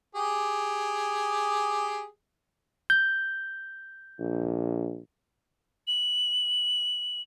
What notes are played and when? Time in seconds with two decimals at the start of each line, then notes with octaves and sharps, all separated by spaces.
0.15 G4 G#4
2.90 G6
4.19 A#1
5.87 F#7